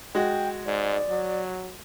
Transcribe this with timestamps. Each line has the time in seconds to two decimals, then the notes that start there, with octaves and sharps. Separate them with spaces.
0.15 G#3 F#4 G5
0.66 G#2 D5
1.09 F#3